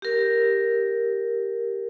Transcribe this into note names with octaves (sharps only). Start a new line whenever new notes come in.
G4 A#4